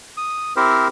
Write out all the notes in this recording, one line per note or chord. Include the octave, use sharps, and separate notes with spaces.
D#6
C4 E4 G4 A#4 C5